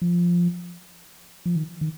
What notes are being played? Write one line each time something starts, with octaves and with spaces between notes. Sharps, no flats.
F3
F3
D#3
D#3